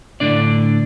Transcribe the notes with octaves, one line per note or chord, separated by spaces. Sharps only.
A2 D3 D4 D5